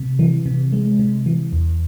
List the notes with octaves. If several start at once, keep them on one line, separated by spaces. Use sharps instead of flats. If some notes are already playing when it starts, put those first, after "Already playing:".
Already playing: C3
E3
C3
G#3
C3
E3
E2